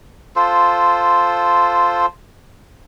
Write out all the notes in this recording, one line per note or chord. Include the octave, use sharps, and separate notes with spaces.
F4 A4 C5